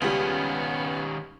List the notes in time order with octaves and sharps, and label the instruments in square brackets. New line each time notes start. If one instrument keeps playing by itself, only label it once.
[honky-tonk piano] C#2 G3 [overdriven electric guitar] D#3 C#4 [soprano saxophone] B3